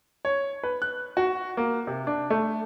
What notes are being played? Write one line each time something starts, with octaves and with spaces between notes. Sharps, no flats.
C#5
B4
F#6
F#4
A#3
C3
D4
A3